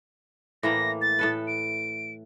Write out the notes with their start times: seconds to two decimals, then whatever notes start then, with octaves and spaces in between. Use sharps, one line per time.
0.63 A2 E3 A#3 A#6
1.02 A6
1.19 A2 A4 B4
1.47 D7